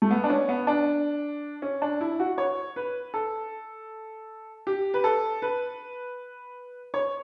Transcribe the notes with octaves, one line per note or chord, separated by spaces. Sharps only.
A3
B3
D4
C#4
B3
D4
C#4
D4
E4
F#4
C#5
B4
A4
G4
B4
A4
B4
C#5